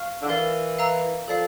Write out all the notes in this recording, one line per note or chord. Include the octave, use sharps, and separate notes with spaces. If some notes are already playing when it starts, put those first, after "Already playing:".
Already playing: F5 C#6 F6
D3
E3 A#4 D5 F5
F5 A#5 E6
F3 A4 D5 F5